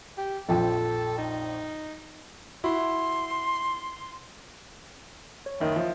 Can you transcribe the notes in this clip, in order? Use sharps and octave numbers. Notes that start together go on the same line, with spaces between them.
G4
A#1 F2 A4 G5
D#4
E4 F#4 C6
C#5
F#1 D#3 D#5 E5
F3